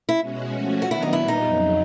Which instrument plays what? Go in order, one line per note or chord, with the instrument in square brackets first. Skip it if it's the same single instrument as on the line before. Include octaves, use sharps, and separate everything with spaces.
[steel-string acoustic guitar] E4
[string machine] B2 G#3 C#4 F#4
F3 A3 C#4 F#4
[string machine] D#3 F#3 B3 D4 [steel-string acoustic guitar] F#4
[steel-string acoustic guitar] E4
D#4
[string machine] A#2 G3 B3 [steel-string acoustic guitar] E4
[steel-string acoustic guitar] D#4
[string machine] F2 C#3 F#3